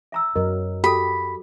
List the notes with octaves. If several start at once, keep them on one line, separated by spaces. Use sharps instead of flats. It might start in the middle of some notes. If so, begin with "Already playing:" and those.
E5 A#5 E6
F#2 F#3 A#4 D#5
F#4 G4 A4 B5